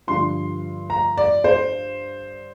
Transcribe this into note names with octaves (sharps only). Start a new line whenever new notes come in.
G2 D3 F3 C6
A#5
D5
C5